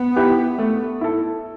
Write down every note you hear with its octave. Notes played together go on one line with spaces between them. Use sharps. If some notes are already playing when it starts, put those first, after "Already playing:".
Already playing: B3
E4 G4 B4
A3
E4 A4